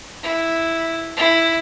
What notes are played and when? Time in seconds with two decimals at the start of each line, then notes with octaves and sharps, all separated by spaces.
0.23 E4
1.17 E4